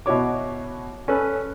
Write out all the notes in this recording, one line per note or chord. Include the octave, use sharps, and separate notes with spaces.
B2 E4 F#4 C#5 D6
C#4 A4 B4